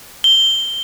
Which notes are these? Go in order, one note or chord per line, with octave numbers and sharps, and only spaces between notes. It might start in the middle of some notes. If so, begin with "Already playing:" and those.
G7